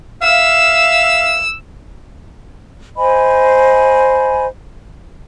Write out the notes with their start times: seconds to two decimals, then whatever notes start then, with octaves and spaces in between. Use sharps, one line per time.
0.23 E5 F5 E6
2.97 C5 D#5 G#5 B5